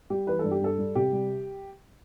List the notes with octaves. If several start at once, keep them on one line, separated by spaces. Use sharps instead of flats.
G3 G4
E3 B4
G2 A4
G4
G2 A4
G3
C3 G4
G3